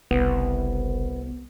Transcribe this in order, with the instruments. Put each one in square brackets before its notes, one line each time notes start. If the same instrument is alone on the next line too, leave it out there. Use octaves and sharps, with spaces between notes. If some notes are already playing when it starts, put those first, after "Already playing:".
[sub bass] F#1 [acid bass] C2 [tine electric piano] B3